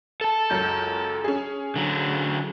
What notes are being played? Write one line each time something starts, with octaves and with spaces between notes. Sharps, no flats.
A4 A5
C#2 F#2 G6
C#4 G#4
D3 F#3